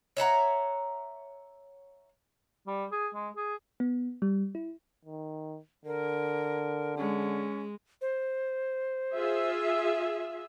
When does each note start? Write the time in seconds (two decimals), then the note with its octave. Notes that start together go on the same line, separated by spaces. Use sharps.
0.17 C#5 E5 F#5 A#5
2.67 G3
2.92 G#4
3.14 G#3
3.36 G#4
3.80 B3
4.22 G3
4.55 E4
5.05 D#3
5.86 D3 A#4
6.97 G#3 C#4
8.01 C5
9.13 F4 G#4 E5